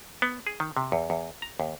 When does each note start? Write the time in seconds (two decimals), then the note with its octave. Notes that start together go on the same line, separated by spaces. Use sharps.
0.22 B3
0.47 G#4
0.60 D#3
0.77 C3
0.92 E2
1.10 E2
1.42 A#5
1.60 D#2